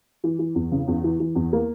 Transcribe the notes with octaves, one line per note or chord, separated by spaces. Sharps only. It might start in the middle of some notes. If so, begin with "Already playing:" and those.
E3
E3
E2
C#3
E2
E3
E3
E2
A#3